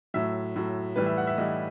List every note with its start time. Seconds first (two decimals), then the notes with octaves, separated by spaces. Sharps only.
0.14 A2 F#3 E5
0.56 A2 F#3
0.96 A2 E3 G3 B4
1.06 E5
1.17 F#5
1.27 E5
1.38 A2 E3 G3 D#5